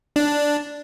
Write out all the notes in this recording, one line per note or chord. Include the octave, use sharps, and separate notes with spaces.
D4